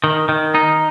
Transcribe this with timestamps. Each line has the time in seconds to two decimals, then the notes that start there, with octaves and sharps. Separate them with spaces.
0.04 D#3
0.29 D#3
0.55 D#4